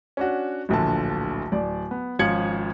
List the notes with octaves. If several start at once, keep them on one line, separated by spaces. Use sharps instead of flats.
C#4 D4 F#4
D1 A#1 D3 A5
D1 D5
B3
G#1 F3 C#4 G#6 C#7 F#7